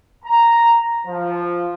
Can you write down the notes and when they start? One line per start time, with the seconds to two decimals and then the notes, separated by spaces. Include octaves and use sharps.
0.25 A#5
1.06 F3